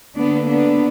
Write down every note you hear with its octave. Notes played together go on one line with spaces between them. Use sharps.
D3 A#3 B3 D4
B3 D4